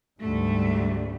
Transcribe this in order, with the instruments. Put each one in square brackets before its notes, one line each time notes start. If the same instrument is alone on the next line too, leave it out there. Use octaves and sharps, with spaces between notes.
[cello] D2 A3 [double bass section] G#2 G3